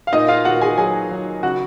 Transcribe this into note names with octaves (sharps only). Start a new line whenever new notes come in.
F5
A#2 D#4 D#5
F4 F5
A#2 F#4 F#5
G#4 G#5
F#3 G#4 G#5
F#3
C#3 F#4 F#5